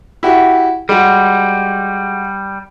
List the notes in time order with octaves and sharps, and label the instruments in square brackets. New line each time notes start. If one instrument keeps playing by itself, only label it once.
[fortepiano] E4 F#4 G4
[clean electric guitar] G3 [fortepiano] G#3 F#4